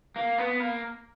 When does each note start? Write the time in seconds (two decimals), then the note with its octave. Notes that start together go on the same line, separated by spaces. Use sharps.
0.16 A#3
0.38 B3
0.60 A#3